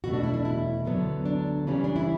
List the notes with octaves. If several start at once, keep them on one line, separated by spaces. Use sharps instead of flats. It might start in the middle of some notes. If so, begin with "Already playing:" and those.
E2 B2 A3 F#4
D4
E4
D4
E4
D2 D3 F#3 B3 D4
D4
C#3 E3 G3 C#4
D4
E4